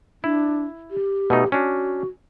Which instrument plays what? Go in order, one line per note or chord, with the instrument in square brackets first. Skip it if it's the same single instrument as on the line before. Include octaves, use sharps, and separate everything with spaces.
[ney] D4 [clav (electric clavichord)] E4
[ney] G4
[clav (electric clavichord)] B2 A3 D#4
[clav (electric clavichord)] C#4 D4 [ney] F#4